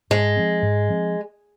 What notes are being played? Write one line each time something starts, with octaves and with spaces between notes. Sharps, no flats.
G#2 G#3
F3 C4
G#2
F3 C4